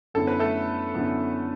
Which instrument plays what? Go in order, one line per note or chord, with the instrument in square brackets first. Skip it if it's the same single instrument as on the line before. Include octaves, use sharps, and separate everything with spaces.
[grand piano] F#2 D3 B3 E4 [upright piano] A4
[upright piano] B4
A3 A4
[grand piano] F#2 D3 B3 E4